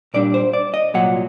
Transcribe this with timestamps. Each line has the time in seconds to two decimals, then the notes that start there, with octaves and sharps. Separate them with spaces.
0.14 A#2 G3 D4 D5
0.34 C5
0.53 D5
0.74 D#5
0.94 C2 A#2 F#3 F#5